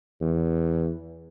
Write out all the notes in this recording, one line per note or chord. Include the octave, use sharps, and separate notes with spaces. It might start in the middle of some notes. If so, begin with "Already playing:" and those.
E2